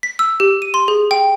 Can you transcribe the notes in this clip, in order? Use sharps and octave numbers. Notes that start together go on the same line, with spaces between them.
B6
E6
G4
D#7
C6
G#4
G5